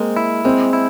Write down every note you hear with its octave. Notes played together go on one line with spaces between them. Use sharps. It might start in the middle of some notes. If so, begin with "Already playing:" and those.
Already playing: G#3 A#3 C4
E4
G#3 C4
E4